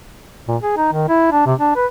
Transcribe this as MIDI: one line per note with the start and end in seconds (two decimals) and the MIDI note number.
0.48 0.57 46
0.62 0.76 68
0.77 0.88 63
0.92 1.08 51
1.08 1.31 64
1.32 1.43 62
1.46 1.54 48
1.59 1.72 62
1.76 1.86 71